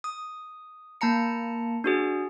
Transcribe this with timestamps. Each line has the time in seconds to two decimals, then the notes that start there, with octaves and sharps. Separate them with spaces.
0.04 D#6
1.01 A#3 A5 A#5 C#7
1.84 D4 F#4 G#4